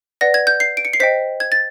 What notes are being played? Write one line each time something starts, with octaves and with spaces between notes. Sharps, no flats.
B4 D5 F#5 A#6
G#6
G6
C7
D7
C#7
C7
C5 D#5 G5 B6
G#6
A6